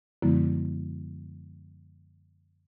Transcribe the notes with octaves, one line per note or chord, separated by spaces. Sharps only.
F#2 D3 F3 G#3 B3 E4